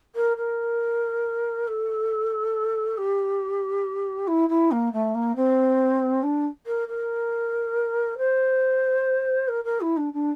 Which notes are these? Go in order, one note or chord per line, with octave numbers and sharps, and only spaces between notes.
A#4
A#4
A4
G4
E4
E4
A#3
A3
A#3
C4
D4
A#4
A#4
C5
A#4
A#4
E4
D4
D4